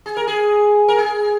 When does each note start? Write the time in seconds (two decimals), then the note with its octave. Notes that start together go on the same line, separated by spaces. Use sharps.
0.06 G#4
0.17 A#4
0.27 G#4
0.88 A#4
0.98 G#4